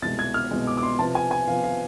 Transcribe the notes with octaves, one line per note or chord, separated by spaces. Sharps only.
C2 B2 G#3 A6
G#6
F6
C2 B2 G#3
D6
D6
C6
C3 F3 B3 A5
G#5
G#5
C3 F3 B3 F5
F5